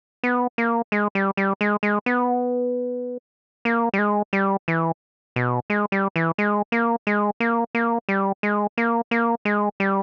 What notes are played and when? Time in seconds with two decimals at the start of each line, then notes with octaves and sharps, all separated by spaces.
0.24 B3
0.58 A#3
0.92 G#3
1.15 G3
1.37 G3
1.61 G#3
1.83 G#3
2.06 B3
3.65 A#3
3.93 G3
3.99 G#3
4.33 G3
4.68 E3
5.36 B2
5.70 G#3
5.92 G3
6.16 E3
6.38 G#3
6.72 A#3
7.07 G#3
7.40 A#3
7.75 A#3
8.09 G3
8.43 G#3
8.78 A#3
9.11 A#3
9.45 G#3
9.80 G3